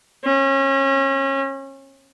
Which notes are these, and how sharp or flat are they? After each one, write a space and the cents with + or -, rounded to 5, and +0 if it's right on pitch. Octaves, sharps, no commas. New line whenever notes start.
C#4 -30